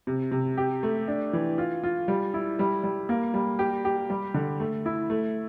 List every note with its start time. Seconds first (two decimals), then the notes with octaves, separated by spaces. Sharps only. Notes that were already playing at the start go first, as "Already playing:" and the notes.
0.07 C3
0.31 C3
0.57 G4
0.83 A3
1.08 D4
1.33 E3
1.58 F4
1.83 F4
2.08 G3
2.34 E4
2.59 G3
2.83 G3
3.09 A#3
3.34 G3
3.59 G4
3.85 G4
4.10 G3
4.34 D3
4.60 A3
4.86 E4
5.10 A3